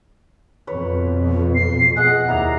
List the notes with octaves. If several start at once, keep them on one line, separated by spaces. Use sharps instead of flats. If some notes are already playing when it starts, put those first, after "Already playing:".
F2 B2 B4 C#5
C7
G#4 D#5 F#5 F#6
D#2 E4 A#4 D5 A#5